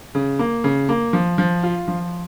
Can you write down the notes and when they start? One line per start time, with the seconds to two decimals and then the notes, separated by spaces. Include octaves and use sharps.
0.15 C#3
0.39 A#3
0.64 C#3
0.89 A#3
1.13 F3
1.38 F3
1.63 F4
1.88 F3